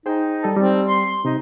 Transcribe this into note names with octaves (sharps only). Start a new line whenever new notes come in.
D#4 G#4 C5 G5
G3 A4 A5
G3 C4
C6
C3 D#4